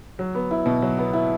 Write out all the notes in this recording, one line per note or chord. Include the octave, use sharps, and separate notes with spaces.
F#3
B3
E4
B2
F#3
B3
E4